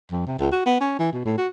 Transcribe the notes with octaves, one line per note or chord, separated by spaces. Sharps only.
F2
C3
C#2
F#4
B3
C#4
E3
B2
A2
F#4